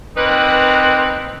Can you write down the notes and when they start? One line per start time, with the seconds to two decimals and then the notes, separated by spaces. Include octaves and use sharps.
0.17 A#3 C4 D#4 B4